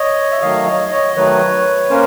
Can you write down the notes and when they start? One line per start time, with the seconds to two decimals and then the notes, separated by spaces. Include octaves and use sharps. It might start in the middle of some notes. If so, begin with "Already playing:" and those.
Already playing: C#5 D#5
0.31 E5
0.42 D#3 F#3 A3 D#5 F5
0.67 C#5 D#5
0.91 C#5 D#5
1.16 D#3 F#3 A3 B4 C#5
1.90 A#3 C#4 A#4 C5